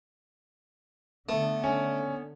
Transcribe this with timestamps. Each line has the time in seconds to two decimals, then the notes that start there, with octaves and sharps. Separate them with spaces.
1.29 D3 A3 B3
1.64 C#4